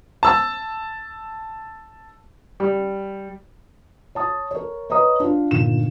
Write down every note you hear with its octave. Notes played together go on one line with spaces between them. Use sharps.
A5 E6
G3
C#5 A5 D#6
A#4 C#5
B4 C#5 D#5 A#5 D#6
D4 F4
G1 A#2 D#3 E7